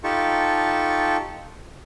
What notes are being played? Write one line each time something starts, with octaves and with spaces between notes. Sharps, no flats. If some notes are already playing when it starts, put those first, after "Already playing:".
D#4 F4 G4 A4 A5 C#6